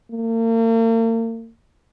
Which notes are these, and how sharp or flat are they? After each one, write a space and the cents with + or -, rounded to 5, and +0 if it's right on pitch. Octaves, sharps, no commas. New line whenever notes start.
A#3 -40